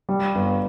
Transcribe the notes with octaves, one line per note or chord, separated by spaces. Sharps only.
G3
G1